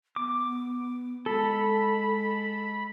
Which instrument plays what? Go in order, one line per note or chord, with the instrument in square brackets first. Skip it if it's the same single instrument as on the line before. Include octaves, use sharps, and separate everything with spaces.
[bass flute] B3 [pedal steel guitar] D6
[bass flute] G#3 [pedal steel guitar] A4 [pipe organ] B5